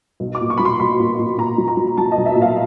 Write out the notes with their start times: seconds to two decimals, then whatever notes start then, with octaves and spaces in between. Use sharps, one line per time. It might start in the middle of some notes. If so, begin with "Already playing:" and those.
0.20 B1
0.35 D6
0.41 A#2
0.50 C#6
0.57 F#3 B5
0.65 C6
0.80 B1 B5
1.00 A#2
1.19 A#2
1.38 A#2 A#5
1.58 F#3
1.68 A#5
1.77 F#3
1.97 F#3 A5
2.12 D#5
2.17 B1
2.26 E5
2.36 A#2
2.42 F5